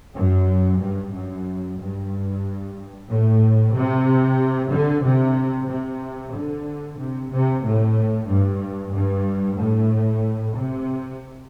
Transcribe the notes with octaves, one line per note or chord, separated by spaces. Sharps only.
F#2
G2
F#2
G2
A2
C3
D3
C3
C3
D3
C3
C3
A2
G2
G2
A2
C3